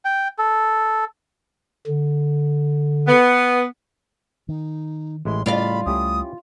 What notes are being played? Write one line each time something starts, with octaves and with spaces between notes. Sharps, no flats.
G5
A4
D3
B3
D#3 D#4
A1 G#3 E4 C6
A2 C#3 G3 F4 D5 F5 B5
C#2 G3 A3 C#4 E4 G4 D#6